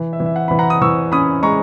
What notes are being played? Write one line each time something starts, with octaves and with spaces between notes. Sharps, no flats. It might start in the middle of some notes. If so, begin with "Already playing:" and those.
Already playing: E3
E5
E3
E5
F#5
E3 B5
F#5 A#5
D#6
E3 C#6 E6
C#4 B5 D#6
G#3 A#5 C#6